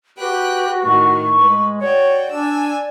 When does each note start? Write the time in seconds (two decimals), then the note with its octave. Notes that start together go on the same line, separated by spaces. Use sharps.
0.18 F#4 G4 B4 G5 F#6
0.82 A2 D#3 C#6
1.39 G#3 B4
1.81 F#4 C#5 D5 G5
2.32 D4 G#5 E6